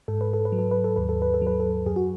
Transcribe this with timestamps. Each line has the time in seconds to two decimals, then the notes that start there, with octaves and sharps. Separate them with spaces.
0.08 G#2 A4
0.21 B4
0.33 A4
0.45 B4
0.52 F#3
0.59 A4
0.71 B4
0.84 A4
0.96 D#2 B4
1.09 A4
1.22 B4
1.34 A4
1.42 F#3
1.47 B4
1.60 A4
1.86 F#2 G#4
1.96 F#4